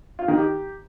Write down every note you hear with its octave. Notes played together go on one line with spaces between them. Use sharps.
F4
D#3
G4